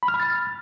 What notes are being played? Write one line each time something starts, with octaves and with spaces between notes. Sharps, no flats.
B5
F6
B5
A6